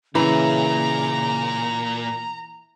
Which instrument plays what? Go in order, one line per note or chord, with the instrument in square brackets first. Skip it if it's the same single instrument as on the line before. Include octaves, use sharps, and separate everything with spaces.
[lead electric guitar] A#2 [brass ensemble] C#3 [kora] E3 [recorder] A#5